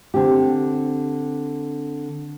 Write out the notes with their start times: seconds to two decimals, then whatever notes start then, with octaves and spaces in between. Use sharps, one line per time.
0.14 D3 C4 D4 G4